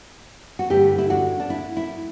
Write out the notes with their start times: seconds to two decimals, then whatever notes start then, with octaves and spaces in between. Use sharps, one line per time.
0.59 F#4
0.70 G2 D3 A3 E4 G4
0.99 E4
1.10 D4 F#4
1.40 D4
1.50 E4
1.77 E4